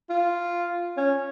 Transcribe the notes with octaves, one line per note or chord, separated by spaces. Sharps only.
F4
C#4